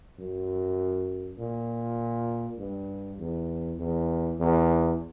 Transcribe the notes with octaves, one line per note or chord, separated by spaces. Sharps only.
F#2
A#2
G2
E2
E2
E2